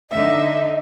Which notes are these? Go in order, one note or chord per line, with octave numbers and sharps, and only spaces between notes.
D3 D#4 D#5 E5